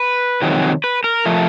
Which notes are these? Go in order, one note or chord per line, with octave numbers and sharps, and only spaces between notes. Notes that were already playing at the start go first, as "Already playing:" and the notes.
Already playing: B4
F2 C3 D#3 F#3
B4
A#4
F3 A3